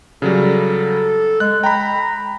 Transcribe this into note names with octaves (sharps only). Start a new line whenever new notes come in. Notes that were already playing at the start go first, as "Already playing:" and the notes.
C#3 F#3 G3 A4
G#3 F#6
G5 A#5 B5